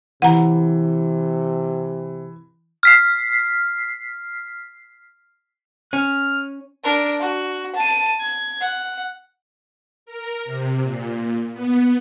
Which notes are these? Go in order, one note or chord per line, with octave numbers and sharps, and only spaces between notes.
C3 E3 F#5 A#5
F6 B6 C7
C#4 F6
D4 A#4
F#4
A5 D#7
G#6
F#5
A#4
C3
A#2
B3